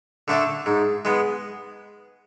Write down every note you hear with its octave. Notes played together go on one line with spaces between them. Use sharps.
D3 A3 D4 A4
G#2
G#3 B3